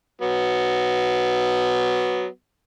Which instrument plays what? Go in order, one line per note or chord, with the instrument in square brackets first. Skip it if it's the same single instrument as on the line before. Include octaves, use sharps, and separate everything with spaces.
[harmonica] F#3 B3